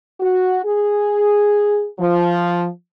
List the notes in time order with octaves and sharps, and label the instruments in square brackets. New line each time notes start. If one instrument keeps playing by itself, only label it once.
[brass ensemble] F#4
G#4
F3